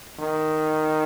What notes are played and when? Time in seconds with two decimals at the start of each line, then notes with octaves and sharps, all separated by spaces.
0.20 D#3